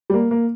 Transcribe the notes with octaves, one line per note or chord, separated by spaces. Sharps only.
G3
A#3
A#3